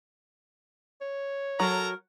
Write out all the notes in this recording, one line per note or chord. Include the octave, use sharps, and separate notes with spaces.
C#5
F#3 A4 A#4 A#5